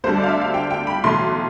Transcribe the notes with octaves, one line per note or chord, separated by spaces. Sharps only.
D2 D3 G3 C5
D5
F5
E5
F5
G5
G5
B5
B1 A2 E3 C6